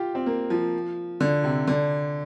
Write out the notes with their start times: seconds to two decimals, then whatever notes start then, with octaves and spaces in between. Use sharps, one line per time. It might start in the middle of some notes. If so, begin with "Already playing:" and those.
Already playing: F4 G4
0.15 C4
0.26 A#3
0.50 F3
1.20 D3
1.44 C3
1.67 D3